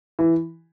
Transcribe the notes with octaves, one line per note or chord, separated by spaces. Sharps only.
E3